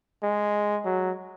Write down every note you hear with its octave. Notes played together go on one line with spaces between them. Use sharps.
G#3
F#3